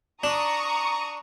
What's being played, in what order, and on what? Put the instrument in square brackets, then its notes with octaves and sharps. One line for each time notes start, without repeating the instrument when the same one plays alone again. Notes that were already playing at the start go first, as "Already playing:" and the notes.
[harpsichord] D4 [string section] A#5 C#6 D#6